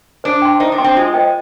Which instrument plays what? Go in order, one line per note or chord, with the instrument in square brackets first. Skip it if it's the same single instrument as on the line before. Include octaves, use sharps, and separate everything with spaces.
[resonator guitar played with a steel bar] D4 [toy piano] C5
[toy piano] G5 C6
[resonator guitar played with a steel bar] D#4 [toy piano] C5
[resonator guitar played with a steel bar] D4
[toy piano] G5 C6
[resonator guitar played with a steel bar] C4
[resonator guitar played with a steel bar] G#3 [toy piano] F4
[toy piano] C5 D#5 G5